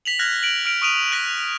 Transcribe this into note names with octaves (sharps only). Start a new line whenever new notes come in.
B6 F7 F#7
F6 F#6 G#6 A#6
D7 F#7
F6 D7 F7
C#6 D#6 D7 D#7 F7
F#6 A#6 B6 D7 F#7